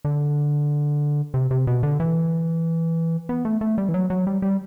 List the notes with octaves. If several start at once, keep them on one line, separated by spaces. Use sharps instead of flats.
D3
C3
C3
B2
D3
E3
B3
A3
A3
G3
E3
F#3
F#3
G3
G3